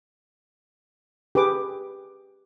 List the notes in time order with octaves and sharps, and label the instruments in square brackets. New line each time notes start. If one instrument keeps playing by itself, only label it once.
[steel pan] G4 G#4 B4 D6